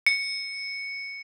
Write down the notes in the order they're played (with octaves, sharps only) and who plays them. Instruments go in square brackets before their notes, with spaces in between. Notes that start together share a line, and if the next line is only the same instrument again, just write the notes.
[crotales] C#7